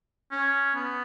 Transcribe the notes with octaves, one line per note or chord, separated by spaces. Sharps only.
C#4
B3